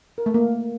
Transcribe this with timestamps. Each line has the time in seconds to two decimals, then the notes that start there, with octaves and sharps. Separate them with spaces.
0.18 A#4
0.26 A3
0.34 A#3